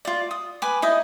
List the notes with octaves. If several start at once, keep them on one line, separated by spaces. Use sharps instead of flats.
F4 D5
D#6
B4 G#5 D6
D#4 E4 D#5